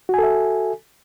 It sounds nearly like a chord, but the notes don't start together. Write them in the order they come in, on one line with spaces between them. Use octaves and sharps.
F#4 G#5 A4 E5